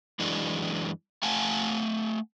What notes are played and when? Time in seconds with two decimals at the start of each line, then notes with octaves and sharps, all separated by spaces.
0.19 F#2 E3 G#3 D4
1.23 A3 F5 F#5 G#5 A5